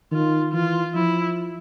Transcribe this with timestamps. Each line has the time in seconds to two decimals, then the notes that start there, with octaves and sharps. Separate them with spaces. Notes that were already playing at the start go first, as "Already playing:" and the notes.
0.12 D#3 F4
0.53 E3 F4
0.95 F3 E4